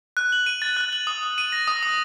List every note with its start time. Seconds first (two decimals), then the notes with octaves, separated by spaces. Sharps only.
0.17 F#6
0.32 F#7
0.46 D#7
0.62 A6
0.77 F#6
0.93 F#7
1.07 D#6
1.23 D#6
1.38 D#7
1.52 A#6
1.68 D#6
1.83 D#6